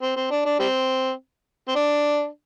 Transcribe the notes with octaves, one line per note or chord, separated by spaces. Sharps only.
C4
C4
D4
D4
G3 C4
C4
D4